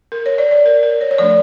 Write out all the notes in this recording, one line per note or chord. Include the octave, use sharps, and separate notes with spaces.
A#4
C#5
D5
D5
A#4
A#4
C#5
C#5
F3 A3 D4 D5